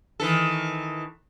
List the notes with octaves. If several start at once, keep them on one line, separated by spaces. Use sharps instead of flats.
D#3 E3 A4